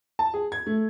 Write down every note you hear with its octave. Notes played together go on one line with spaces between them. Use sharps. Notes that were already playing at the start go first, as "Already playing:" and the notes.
A5
G#4
G#6
A3